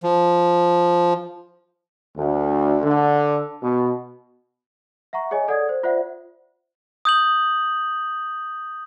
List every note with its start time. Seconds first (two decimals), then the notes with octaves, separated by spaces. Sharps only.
0.03 F3
2.17 D2
2.84 D3
3.63 B2
5.13 E5 F#5 A#5 C#6
5.31 G#4 C#5 D#5 G#5
5.48 A4 D5 F#5 D#6 G#6
5.69 C5
5.83 F4 C5 D5 E5 F#5
7.05 D#6 G6 F#7